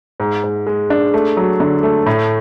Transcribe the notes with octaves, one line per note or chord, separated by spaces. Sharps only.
G#2
G#2
G#3
D4
A3
F#3
D3
A3
A2